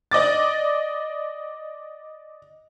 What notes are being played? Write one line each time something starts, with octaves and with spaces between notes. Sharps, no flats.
D5 D#5 D6 A6